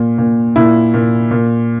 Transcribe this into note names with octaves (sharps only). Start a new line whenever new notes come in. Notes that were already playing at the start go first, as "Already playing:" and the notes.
Already playing: A#2
A#2
A#2 E4
A#2
A#2